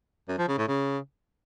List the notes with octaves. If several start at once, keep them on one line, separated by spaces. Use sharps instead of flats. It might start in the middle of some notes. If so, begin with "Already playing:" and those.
F#2
F3
C#3
A2
C#3